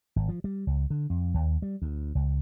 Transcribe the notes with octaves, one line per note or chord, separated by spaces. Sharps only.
G#1
F3
G3
C#2
D3
F2
D#2
G3
D2
C#2